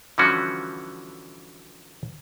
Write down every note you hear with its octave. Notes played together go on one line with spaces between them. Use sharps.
D3 E3 F3 G3 C#4 F#4